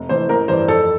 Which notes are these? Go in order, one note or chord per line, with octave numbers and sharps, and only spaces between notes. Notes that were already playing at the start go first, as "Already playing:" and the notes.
Already playing: F1
F2 E3 A3 C5
A1 A#4
G2 E3 C5
F2 A4